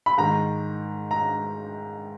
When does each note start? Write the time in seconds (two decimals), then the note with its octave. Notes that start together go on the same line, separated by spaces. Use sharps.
0.06 B5
0.18 G#2 D#3 A#5
1.11 A#5